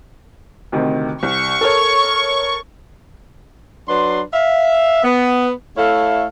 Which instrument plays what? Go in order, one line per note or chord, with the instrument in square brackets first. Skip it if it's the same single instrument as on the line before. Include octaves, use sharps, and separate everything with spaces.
[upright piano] D2 C3 D#3
[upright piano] C2 [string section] C#6
[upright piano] A4 A#4 C#5
[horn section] F#3 D4 B4 C6
E5 F5
B3
A3 E4 A4 C#5 F5